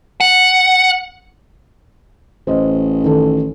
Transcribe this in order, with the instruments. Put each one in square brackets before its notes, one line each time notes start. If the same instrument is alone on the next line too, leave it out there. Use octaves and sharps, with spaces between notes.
[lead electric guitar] F#5
[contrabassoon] A1 [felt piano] C5 D#5
[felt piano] D#3 A4